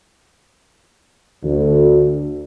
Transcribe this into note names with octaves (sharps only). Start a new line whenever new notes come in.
D2